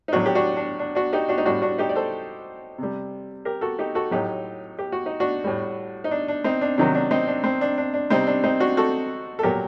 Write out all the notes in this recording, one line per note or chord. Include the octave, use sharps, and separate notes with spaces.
D#4
A2 F#3 D4 F#4
G4
D4 F#4
D4
D4
D4 F#4
D#4 G4
D4 F#4
D#4
A2 G3 D4 F#4
D4 F#4
D#4 G4
D5
A4 C5
C3 G3
G4 A#4
F#4 A4
D#4 G4
F#4 A4
A2 F#3 D#4 G4
G4
F#4
D#4
D4 F#4
A2 G3
D#4
D4
D4
C4 D#4
D4
C3 D#3 F#3 D4
D4
C4 D#4
D4
C4
D4
D4
D4
C3 G3 C4 D#4
D4
C4 D#4
D4 F#4
F#4 A4
A4
A#2 F#3 G4 A#4